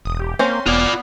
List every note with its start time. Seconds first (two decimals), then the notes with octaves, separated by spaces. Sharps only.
0.05 E1 D#6
0.20 G4
0.39 A#3 C4 C#4 C5 C6
0.67 E1 B3 F4 D5